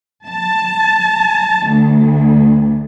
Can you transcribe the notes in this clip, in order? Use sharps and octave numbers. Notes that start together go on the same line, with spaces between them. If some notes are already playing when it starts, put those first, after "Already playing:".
A5
D2